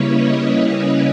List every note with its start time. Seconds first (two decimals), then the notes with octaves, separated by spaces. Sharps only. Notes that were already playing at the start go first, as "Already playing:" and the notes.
Already playing: C#3 G3 A#3 C#4 E4 B4 C#5
0.12 D#5
0.82 D#5